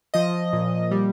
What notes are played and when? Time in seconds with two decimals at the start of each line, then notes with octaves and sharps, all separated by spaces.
0.14 F3 D#5
0.53 A#2
0.91 G3